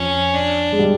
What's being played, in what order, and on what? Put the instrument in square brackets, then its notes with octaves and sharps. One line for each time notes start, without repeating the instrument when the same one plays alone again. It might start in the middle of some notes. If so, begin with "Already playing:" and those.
Already playing: [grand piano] F2 F3 [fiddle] C#4
[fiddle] D4
[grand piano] G#3
G3